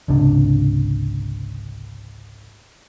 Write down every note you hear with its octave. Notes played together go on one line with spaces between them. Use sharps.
G#1 C#2 C3 D4